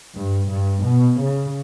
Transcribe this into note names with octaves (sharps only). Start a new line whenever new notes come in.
G2
G2
B2
C#3